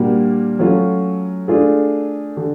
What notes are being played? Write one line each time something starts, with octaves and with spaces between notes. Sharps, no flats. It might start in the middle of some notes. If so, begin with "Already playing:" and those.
Already playing: A#2 G3 A#3 D4 F#4
F#3 A3 C#4 F4
A3 D4 F4 G#4
D3